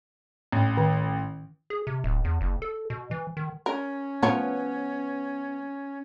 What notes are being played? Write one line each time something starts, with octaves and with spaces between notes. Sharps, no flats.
A1
D#3
G#4
C3
D1
E2
F#1
A4
B2
E3
D#3
C#4 A#4
F3 B3 A#4 C#5